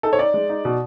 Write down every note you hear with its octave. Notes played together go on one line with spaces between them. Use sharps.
D#4 A4
C#5
D#4 D5
G#3
D#4
B2